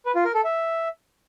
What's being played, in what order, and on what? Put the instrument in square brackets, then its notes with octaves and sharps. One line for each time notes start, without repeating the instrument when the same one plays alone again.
[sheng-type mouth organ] B4
F4
A#4
A4
E5